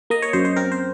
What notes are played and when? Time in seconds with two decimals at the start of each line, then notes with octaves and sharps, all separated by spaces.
0.10 A#3 D#5
0.22 C#5
0.33 F#2 C5
0.45 C5
0.56 C4 A#4
0.72 C5